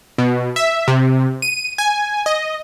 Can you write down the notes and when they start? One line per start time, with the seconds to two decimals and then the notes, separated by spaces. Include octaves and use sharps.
0.18 B2
0.56 E5
0.88 C3
1.42 D#7
1.78 G#5
2.26 D#5